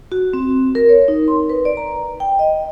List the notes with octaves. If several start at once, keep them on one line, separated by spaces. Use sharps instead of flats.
F#4
C4
A#4
C#5
D#4
C6
B4
D5
A#5
G5
D#5